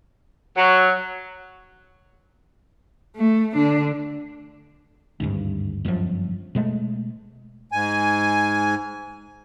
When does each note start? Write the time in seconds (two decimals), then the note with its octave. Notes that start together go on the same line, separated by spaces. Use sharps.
0.57 F#3
3.16 A3
3.55 D3 D4
5.20 G#1 D2 G2
5.85 G1 F#2 A2 F3
6.55 B2 G#3 A3
7.72 G#2 G#5